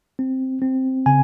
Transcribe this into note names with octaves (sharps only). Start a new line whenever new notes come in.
C4
C4
C#3 G#5